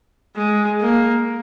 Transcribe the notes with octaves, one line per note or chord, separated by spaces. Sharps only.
G#3
A#3